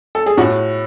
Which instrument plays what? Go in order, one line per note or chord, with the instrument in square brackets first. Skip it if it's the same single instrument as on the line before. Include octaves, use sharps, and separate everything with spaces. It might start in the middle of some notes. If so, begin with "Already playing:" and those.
[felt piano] A4
G#4
A2 F#4